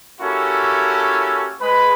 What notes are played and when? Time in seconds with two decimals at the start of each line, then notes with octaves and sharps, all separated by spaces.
0.21 A#3 C#4 E4 F#4 G4 A4
1.61 G#3 B4 B5